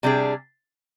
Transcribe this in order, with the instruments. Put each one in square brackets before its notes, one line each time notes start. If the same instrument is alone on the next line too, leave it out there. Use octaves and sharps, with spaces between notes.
[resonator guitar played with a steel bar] C3 G3 D4 G#4